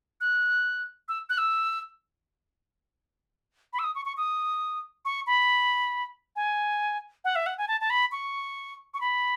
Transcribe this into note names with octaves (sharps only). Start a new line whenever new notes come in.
F#6
E6
F#6
E6
B5
E6
D#6
C#6
C#6
D#6
C#6
B5
G#5
F#5
E5
F#5
G#5
A5
A5
B5
C#6
C#6
B5